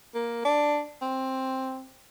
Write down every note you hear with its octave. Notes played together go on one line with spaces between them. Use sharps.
A#3
D4
C4